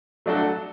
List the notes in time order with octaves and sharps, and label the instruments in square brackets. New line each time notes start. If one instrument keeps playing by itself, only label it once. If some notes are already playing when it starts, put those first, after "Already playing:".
[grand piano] F#3 A3 D4 F#4 A4